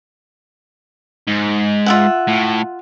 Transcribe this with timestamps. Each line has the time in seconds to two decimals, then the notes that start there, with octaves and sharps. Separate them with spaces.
1.27 G#2
1.86 F4 E5 F#5
2.27 A2